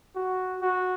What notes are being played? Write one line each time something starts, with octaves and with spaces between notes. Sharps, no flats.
F#4
F#4